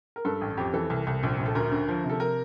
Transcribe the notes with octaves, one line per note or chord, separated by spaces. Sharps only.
A#4
G2 A4
A1
F2 G4
E3 A4
C2
C2
A#1
A#1
A4
D2 A#4
D3
F3
C3
A4
A#4